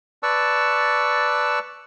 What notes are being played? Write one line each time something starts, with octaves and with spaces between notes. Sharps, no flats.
B4 D5 A5 C#6 E6